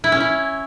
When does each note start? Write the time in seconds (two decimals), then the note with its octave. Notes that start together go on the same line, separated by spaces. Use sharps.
0.04 E4
0.12 C#4
0.20 E4